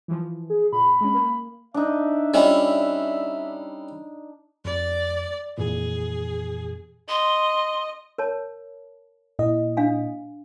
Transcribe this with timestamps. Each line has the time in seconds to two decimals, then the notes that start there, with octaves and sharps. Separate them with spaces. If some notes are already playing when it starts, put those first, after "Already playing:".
0.08 E3 F3
0.50 G#4
0.73 A#2 B5
1.01 G#3 C#4
1.14 A#3
1.74 D4 D#4 E5
2.34 G3 C#4 E4 F4 D#5
4.65 F2 D5
5.58 F2 A#2 E3 G#4
7.09 D#5 C6
8.18 A#4 C#5 A5
9.39 A#2 E4 D#5
9.77 D4 F5 G#5